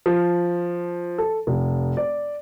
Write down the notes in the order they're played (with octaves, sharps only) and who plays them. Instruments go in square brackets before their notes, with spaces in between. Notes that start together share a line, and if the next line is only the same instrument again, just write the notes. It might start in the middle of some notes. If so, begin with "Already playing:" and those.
[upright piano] F3
A4
F1
D5